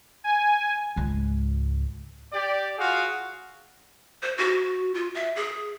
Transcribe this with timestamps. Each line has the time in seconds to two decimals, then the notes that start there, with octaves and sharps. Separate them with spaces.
0.24 G#5
0.96 C#2 G#2
2.33 G4 D5
2.78 F4 F#4 G#4 F5
4.23 C5
4.38 F#4
4.94 F4
5.15 E5
5.36 G#4